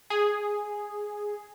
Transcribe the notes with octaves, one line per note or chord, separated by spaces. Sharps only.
G#4